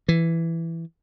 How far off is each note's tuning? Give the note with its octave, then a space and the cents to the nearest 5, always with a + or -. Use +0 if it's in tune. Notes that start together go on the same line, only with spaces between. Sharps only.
E3 +10